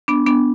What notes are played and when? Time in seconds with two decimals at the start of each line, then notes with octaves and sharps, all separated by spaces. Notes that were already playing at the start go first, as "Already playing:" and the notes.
0.08 B3 D4
0.26 B3 D4